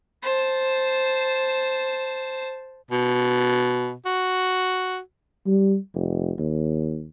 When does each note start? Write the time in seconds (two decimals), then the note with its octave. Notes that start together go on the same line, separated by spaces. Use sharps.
0.23 C5 A5
2.91 B2
4.06 F#4
5.47 G3
5.95 F1
6.39 D#2